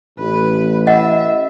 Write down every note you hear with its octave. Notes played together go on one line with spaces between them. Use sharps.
A1 B4
D#5 E5 F#5